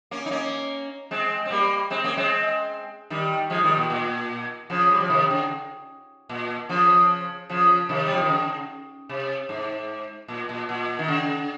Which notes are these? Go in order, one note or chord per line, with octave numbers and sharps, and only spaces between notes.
A#3 C#4
D#4
A#3 C#4
G#3 C4
C4
G3 A#3
G#3 C4
A#3 C#4
G#3 C4
D#3 G3
F3 G#3
D#3 G3
A#2
A#2
C#3 F3
G3
F3
C3 D#3
C#3
A#2
C#3 F3
C#3 F3
C3 D#3
G3
F3
D#3
C#3
C3
G#2
A#2
A#2
A#2
D#3
C#3